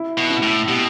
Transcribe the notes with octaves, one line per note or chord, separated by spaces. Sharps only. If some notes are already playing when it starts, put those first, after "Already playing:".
Already playing: E4
B2
E4
A2
B2 G4